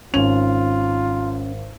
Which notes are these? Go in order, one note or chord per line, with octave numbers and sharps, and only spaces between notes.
G#1 C#4 F4 F7